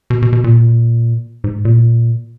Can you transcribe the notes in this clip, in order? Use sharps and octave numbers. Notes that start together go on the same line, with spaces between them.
B2
B2
B2
A#2
G#2
A#2